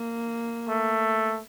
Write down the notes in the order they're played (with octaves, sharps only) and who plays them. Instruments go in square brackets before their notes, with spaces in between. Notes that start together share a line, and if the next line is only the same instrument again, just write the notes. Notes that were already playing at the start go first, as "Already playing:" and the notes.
Already playing: [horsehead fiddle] A#3
[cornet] A3